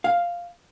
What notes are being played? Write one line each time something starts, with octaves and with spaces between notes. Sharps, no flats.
F5